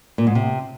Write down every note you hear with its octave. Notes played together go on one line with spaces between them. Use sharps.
A#2
G#2
C3